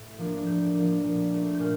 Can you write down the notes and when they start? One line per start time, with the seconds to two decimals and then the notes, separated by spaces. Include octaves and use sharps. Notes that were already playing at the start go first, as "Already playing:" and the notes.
Already playing: A2 E6
0.18 F3 A#3 D4
0.46 A2 G6
0.74 F3 A#3 D4
1.04 A#2
1.32 A3 D4
1.54 G6
1.59 A#2 F6